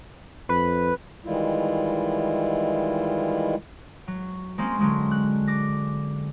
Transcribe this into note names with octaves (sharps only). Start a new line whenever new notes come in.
F2 B4
D#3 E3 G3 G#3 E4 F4
F#3
G#3 A#3 C4 C#4
D3 F#3 G#3 A#3
F#6
D6 A#6